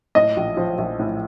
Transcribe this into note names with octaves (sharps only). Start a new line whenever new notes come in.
A2 D#5
A#1
F3
A#1
A2